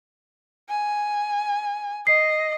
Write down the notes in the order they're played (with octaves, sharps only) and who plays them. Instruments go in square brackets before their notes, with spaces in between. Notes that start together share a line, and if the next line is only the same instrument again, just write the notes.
[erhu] G#5
[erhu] D#5 [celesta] C7